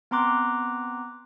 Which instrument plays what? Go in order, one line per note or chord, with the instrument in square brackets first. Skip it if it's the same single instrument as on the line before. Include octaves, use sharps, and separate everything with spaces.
[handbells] B3 C4 A#5 C6 D6 F#6